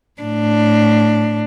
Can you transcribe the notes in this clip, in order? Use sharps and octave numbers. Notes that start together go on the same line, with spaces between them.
A2 D4